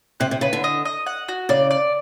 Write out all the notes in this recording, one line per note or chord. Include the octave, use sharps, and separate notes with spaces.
C3 F#5
C3
C#3 B4
D3
D#5
D#5
F#5
F#4
C#3 D5
D5